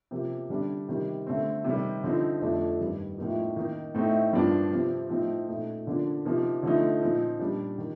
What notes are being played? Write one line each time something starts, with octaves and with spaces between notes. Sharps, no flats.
C3 F3 A#3
D3 G3 D4
C3 D#3 G3
D3 A3 C4
C3 D#3 G3
D3 F3 C4 D#4
F2 D3 F3 A3 D4
G2 D#3 G3
A2 F3 A#3 D#4
D#3 A#3 D#4
A2 A3 C4 D#4
G2 F3 A#3 D4
C3 F3 C4
A2 F3 C4 D#4
A#2 A3 D#4
D3 F3 A#3 D4
C3 F3 A#3 D#4
D3 F3 A3 D#4
A#2 F3 C4 D#4
A#2 G3 D4
D#3